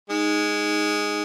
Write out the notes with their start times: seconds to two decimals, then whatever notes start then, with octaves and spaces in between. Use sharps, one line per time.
0.10 G#3 D#4